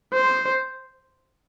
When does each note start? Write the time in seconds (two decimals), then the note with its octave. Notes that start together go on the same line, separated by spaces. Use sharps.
0.13 C5